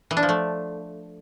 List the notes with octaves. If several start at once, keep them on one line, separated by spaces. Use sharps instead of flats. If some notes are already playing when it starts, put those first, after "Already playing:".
E3
D4
F3
A3